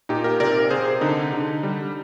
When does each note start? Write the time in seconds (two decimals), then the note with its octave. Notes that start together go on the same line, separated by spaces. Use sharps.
0.09 A#2 D#4 G4
0.24 G4 A#4
0.40 C3 A#4 D5
0.70 C3 G#4 C5
1.01 D3 D#4
1.33 D3
1.63 G3